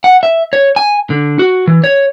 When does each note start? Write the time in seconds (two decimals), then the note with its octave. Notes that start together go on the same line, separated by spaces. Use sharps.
0.04 F#5
0.23 E5
0.53 C#5
0.76 G#5
1.10 D3
1.39 F#4
1.68 E3
1.84 C#5